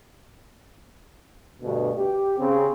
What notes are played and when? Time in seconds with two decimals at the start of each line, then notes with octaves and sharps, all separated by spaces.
1.62 D2 G2 B2
1.96 G4
2.38 C#3 C4